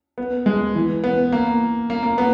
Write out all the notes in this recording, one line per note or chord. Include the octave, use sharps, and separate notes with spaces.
B3
G#3
E3
B3
A#3
A#3
A#3
B3